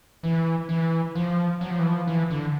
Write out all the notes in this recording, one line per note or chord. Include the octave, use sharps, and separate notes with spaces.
E3
E3
F3
F#3
F3
E3
F3
E3
D3